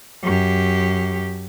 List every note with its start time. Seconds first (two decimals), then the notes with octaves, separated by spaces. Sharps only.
0.23 F#2 G4